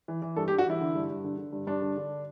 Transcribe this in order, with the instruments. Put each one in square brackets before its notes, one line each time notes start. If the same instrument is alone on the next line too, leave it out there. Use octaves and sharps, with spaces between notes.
[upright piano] E3
E3
G2 A4
G4
G2
F#4
E3 E4
D3
G2
G2
D3
D3
G2
G2 D4
D3
D3